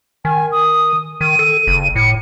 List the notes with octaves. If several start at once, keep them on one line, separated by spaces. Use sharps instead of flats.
D#3 G#5
D#6
D#3 D#7
A4
F#1
A2 C#7